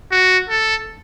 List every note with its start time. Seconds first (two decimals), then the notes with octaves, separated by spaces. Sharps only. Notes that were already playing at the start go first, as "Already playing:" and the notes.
0.12 F#4
0.49 A4